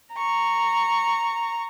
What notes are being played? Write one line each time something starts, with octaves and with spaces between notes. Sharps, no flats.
A#5 C#6